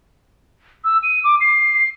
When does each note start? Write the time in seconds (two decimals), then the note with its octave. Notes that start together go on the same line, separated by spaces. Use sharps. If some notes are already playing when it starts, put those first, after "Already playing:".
0.84 E6
1.03 D#7
1.24 D6
1.40 C7